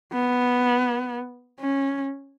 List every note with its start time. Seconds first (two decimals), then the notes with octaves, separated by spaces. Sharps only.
0.13 B3
1.60 C#4